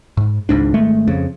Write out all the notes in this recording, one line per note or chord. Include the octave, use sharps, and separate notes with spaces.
G#2
G#1 C#2 G#2 D4
G#1 G#3 A3
F2 C#3